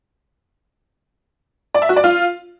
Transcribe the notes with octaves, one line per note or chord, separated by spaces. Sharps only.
D5
E5
F#4
D5
F4